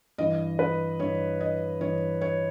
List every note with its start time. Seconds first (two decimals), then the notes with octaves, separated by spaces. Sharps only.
0.18 G2 E3 D#5
0.59 B4
1.00 G2 E3 C#5
1.40 D#5
1.81 G2 E3 C#5
2.21 C#5